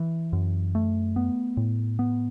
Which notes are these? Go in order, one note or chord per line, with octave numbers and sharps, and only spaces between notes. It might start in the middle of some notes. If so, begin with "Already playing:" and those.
Already playing: E3
F#2
A3
B3
A2
B3